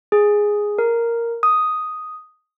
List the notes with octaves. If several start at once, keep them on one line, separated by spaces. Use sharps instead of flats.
G#4
A#4
D#6